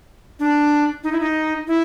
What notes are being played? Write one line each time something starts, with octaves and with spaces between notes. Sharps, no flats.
D4
D#4
E4
D#4
E4